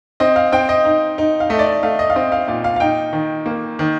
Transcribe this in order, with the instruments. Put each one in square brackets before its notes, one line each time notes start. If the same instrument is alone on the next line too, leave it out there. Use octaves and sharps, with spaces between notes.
[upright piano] C4 D#5
F5
C4 G5
D#5
D#4
D#4
F5
A3 D#5
D5
D#5
A3 F5
D#5
F5
C4 D#5
F5
A#2 F5
F5
F5
D#4 G5
D#3
A#3
D#3